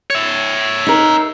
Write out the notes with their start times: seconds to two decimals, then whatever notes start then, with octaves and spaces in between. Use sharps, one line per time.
0.10 C#5 E5
0.86 D#4 A#4